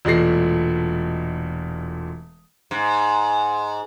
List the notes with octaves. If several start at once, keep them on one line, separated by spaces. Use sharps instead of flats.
E1 A#2 G#3 A3 A#6 C7
G#2